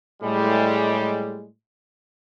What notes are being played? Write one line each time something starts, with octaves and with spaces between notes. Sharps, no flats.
A2 G3 G#3